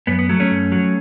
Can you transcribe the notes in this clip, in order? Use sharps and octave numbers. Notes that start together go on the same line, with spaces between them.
F#2 B3
B3
F#3 A3
A3 C#4
F#2
F#3